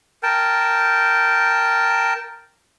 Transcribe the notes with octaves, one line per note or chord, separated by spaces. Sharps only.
A#4 G5 A5